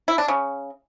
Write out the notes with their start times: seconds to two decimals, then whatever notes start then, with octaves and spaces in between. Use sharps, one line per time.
0.08 E4
0.18 D4
0.28 C#3